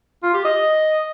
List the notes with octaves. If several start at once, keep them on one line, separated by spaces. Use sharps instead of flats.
F4
G4
D#5